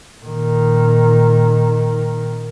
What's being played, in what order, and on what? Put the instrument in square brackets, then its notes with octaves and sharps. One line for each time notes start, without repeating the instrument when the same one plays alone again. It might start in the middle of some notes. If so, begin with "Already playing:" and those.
[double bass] A#2 D#3